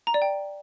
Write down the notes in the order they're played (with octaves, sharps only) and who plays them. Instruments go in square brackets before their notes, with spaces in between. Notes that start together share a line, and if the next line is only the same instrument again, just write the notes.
[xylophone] A#5
D5
G5